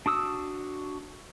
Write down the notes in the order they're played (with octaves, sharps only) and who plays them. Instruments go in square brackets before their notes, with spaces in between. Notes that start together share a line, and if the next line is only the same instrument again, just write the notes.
[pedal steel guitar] D4 F#4 D#6 E6